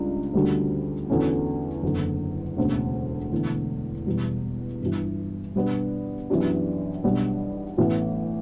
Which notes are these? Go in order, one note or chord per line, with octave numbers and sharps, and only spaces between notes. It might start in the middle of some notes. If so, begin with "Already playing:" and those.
Already playing: C#2 C#3 G3 D4
D2 D3 G3 C#4 F#4
E2 D3 A3 C#4 F#4
F#1 E2 D3
E1 D2 C#3
E1 E2 D3 A3
E1 E2 B2 G3
G1 G2 E3
B2 G3 B3 D4
F#2 E3 B3 D4 G4
B1 B2 G3 B3 D4
A1 A2 E3 B3